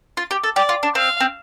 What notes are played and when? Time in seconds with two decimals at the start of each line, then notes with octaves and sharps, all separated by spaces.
0.17 F4
0.31 G4
0.44 A4
0.56 G4 D5
0.69 F4
0.83 D4
0.95 C4 F5
1.20 C4